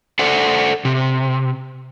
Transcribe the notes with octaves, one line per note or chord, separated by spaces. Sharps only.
A4 C5 D5 F#5
C3